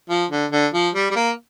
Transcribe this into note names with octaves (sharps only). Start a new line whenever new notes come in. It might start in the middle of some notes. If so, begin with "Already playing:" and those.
F3
D3
D3
F3
G3
G3
A#3